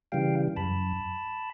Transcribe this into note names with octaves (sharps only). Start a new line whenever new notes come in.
C#3 E3 G3 F5 G5
F#2 A5 B5